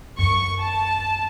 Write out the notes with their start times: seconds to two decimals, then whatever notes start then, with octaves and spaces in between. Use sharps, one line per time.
0.19 F#2 C#6
0.60 A5